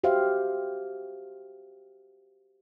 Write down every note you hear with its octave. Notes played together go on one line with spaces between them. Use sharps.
F#4 G4 C5 E5 F5